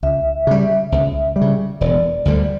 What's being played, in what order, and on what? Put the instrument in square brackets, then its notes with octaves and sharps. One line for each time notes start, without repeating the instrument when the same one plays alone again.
[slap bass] C#2 [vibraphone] E5
[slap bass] C#3 G3
C#2
G3
C#3
[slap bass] E1 [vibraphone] D5
[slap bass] D2 D3 G3